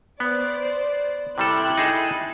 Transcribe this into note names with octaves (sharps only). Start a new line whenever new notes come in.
B3 C5 D5
C3 G3 E4 A4 G5 F#6
D#4 G#4 A4